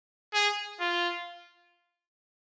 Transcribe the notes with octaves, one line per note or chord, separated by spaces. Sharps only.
G#4
F4